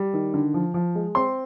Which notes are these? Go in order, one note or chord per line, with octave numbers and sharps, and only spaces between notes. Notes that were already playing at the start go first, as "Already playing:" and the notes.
Already playing: G3
D#3
D3
F3
F3
G#3
C4 C6